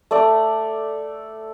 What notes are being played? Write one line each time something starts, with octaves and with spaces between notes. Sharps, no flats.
A3 D5